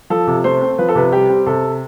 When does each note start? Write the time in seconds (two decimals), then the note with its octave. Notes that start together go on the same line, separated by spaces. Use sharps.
0.10 F3 A4
0.27 C3
0.44 A3 C5
0.61 C4
0.78 F3 B4
0.89 A4
0.95 C3 B4
1.12 G3 G4
1.29 C4
1.46 C3 A4